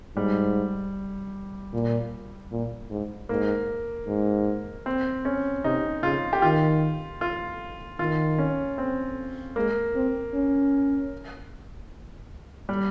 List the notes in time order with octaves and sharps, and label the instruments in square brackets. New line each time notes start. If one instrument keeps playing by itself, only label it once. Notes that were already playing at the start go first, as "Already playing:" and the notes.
[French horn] G#2 [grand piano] G3
[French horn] A#2
A#2
G#2
[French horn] G#2 [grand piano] A#3
[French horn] G#2
[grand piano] C4
C#4
[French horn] C3 [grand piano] D#4
[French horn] C#3 [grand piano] F4
[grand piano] G4
[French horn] D#3 [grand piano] F4
[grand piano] F4
[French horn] D#3 [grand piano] F4
[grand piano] C#4
C4
[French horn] G#3 [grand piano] A#3
[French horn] C4
C#4
[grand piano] G3